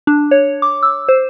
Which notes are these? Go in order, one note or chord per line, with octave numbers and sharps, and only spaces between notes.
D4
C#5
D6
E6
C5